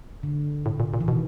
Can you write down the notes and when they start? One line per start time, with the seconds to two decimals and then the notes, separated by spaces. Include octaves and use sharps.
0.23 D3
0.66 A2
0.80 A#2
0.94 A#2
1.00 E3
1.08 B2 D#3